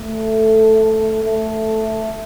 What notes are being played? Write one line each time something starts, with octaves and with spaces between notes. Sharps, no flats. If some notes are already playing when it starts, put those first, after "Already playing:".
Already playing: A3
A3